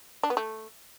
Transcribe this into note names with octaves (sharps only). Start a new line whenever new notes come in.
D4
B3
A3